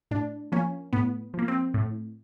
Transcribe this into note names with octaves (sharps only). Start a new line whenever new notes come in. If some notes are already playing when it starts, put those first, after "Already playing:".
A2 D4
F3 A#3 C#4
A2 B3
F3 A#3
C4
A2